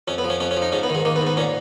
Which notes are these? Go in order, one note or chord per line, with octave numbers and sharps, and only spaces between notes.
F2 C#4
B3
F3
C#4
F2 C#4
C#4
F3
D#4
G#2 C#4
B3
D#3
G#3
D#3 A#3
B3
G#2
B3
A#2 C#4